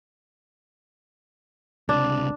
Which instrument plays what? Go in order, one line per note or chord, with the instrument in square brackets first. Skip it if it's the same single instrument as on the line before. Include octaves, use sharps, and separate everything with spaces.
[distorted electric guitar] C#2 C3 [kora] D4